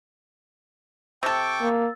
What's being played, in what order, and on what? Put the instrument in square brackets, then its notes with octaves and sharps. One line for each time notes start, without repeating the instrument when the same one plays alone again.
[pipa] C3 A4 [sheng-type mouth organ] G5 C#6 D6 [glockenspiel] E6 A6
[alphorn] A#3